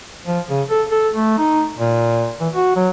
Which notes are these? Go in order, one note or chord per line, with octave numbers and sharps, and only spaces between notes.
F3
C#3
A4
A4
A3
D#4
A#2
E3
F#4
F#3